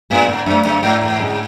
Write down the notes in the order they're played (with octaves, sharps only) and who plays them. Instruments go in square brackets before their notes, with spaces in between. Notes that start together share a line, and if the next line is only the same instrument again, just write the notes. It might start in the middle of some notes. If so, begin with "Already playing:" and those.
[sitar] A2 [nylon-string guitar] G#3 B3 D4
[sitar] G#2 [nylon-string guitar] D3
[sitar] F#2 [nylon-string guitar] A3 D4
[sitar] F#2 [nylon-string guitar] D3
[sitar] G#2 [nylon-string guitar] A3 D4
[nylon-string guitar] E2
D3 G#3 C#4 G#4